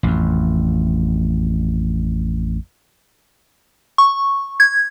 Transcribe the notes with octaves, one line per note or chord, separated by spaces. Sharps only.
A1 F2
C#6
G#6